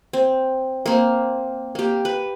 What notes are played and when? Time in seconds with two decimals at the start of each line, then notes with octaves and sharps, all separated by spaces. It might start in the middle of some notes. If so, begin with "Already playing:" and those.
0.13 C4
0.86 A#3 C4
1.75 A#3 G4
2.05 B4